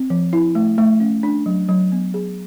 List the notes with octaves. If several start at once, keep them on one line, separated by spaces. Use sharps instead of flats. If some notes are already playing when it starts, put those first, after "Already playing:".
Already playing: C4
F3
E4
A3
A3
C#4
D4
F#3
F#3
B3
G#4